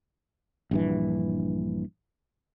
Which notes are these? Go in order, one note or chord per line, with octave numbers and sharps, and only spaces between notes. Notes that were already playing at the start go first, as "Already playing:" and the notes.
A#1 G2 E3